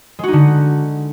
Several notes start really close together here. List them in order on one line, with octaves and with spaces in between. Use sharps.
G#3 F#4 D#4 D3